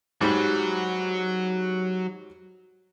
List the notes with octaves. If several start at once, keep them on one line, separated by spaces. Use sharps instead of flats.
G#2 F#3 G3 F#4 G4